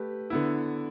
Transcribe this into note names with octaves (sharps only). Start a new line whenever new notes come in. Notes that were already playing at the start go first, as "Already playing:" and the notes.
Already playing: A3 G4 B4
D3 B3 E4